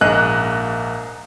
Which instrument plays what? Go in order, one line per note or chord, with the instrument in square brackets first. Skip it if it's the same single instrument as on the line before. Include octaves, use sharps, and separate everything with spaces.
[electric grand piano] A#1 [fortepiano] G#2 D#5 [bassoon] A#3 [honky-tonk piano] F#6